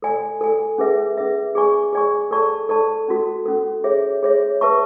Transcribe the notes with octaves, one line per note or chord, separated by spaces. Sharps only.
A4 D5 G#5
A4 D5 G#5
C#4 G#4 B4 E5
C#4 G#4 B4 E5
G#4 D5 G#5 C#6
G#4 D5 G#5 C#6
A4 D5 A5 C#6
A4 D5 A5 C#6
C#4 F#4 A4
C#4 F#4 A4
G#4 C#5 E5
G#4 C#5 E5
B4 E5 A5 C#6